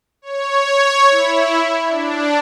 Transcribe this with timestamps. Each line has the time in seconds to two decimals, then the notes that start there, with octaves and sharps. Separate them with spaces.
0.22 C#5
1.11 E4
1.87 D4